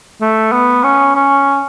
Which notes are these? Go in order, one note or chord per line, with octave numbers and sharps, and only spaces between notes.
A3
B3
C#4
C#4